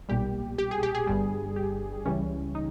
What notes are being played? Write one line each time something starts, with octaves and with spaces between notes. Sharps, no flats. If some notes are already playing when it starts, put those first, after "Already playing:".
B1 A#2 G3 G4
G4
G#4
G4
G#4
G1 G2 G3
G4
C#2 C#3 E3 G3 C#4
D#4